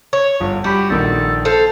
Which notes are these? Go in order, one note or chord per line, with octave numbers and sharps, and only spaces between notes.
C#5
G1 F4
G3 F#4 G4 B5
A#1 D#3 A4 E6
A4 C5 F5